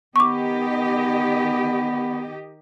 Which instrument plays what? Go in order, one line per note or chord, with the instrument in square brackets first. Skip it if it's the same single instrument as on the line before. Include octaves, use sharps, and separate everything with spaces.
[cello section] D#3 G4 D#5 [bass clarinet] B3 [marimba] C#6 D6